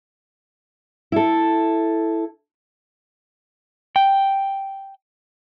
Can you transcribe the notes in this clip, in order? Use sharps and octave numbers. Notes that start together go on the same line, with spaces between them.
E4 A4
G5